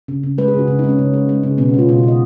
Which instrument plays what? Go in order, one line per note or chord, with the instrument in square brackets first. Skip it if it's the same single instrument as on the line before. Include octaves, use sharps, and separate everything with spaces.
[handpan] C#3
C#3
G#3 B4
G#4
C#3 F#4
C#3
D#4
G#3
C#4
C#3
G#3
G#3
C#3
B2 B3
C#4
G#3 F4
B2 D#4
F#4
B2 D#5